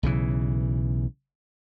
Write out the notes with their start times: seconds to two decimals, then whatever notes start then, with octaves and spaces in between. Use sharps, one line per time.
0.03 B1 C#3 E3